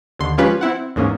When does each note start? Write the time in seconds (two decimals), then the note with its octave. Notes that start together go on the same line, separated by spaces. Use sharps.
0.19 D#2 D3 C6
0.38 F3 G#3 C#4 F4 G4 B4
0.61 C4 E4 F#5
0.96 E2 G#2 A#3 C#4